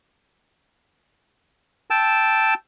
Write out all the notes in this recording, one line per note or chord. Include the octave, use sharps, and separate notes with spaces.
G5 A5 E6